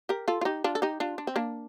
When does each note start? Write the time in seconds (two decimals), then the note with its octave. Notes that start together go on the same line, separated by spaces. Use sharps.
0.09 G4 A#4
0.28 F4 A4
0.41 F4
0.45 D#4 G4
0.64 D4 F4
0.75 A4
0.82 D#4 G4
1.00 D4 F4
1.18 D4
1.27 C4
1.36 A#3 D4